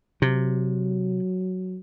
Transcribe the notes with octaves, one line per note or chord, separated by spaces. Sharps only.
C3 F#3